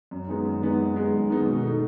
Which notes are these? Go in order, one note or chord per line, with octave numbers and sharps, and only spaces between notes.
F#2
D#3 G#3 B3 D#4
F#2
D#3 G#3 B3 D#4
F#2
D#3 G#3 B3 D#4
F#2
D#3 G#3 B3 D#4
B2
A3 D#4